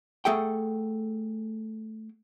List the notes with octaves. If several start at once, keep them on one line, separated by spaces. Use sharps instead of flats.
A3 G#4 A4 F#5 G5